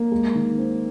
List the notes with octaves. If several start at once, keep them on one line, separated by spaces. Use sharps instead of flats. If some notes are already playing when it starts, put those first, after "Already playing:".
Already playing: A#3
G#3
D#3
C4